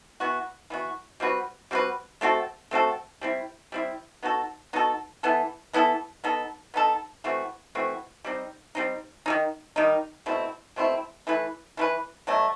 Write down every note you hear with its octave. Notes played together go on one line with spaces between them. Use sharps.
E3 B3 F#4
E3 B3 F#4
G3 C4 F#4 B4
G3 C4 F#4 B4
A3 C4 F#4 A4
A3 C4 F#4 A4
G3 C4 E4
G3 C4 E4
B3 D#4 F#4 A4
B3 D#4 F#4 A4
E3 B3 E4 A4
E3 B3 E4 A4
B3 D#4 A4
B3 D#4 A4
E3 A3 C4 F#4
E3 A3 C4 F#4
G3 C4 D#4
G3 C4 D#4
D#3 G3 D#4
D#3 G3 D#4
B2 A3 C4 E4
B2 A3 C4 E4
E3 A3 E4 B4
E3 A3 E4 B4
B2 F#3 A3